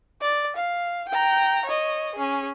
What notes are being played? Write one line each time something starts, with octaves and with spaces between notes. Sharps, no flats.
D5
F5
G5 A#5
C#5 D#5
C#4 G#4